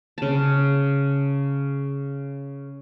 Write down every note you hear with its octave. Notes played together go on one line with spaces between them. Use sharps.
C#3 A5